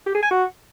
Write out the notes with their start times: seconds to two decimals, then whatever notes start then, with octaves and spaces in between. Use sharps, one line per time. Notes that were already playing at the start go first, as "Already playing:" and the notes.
0.06 G4
0.14 G#4
0.23 G#5
0.31 F#4